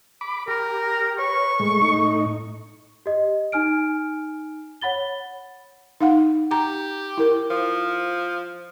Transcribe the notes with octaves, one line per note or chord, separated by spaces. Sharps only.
B5 D6
G4 A#4
B4 C#5 C#6
A2 G#3
A2 D#4
G4 D#5
D#4 G#5 F6 D7
C#5 F#5 B5 A6 G7
D#4 F5 F#5
G4 A#5
E4 A#4
F3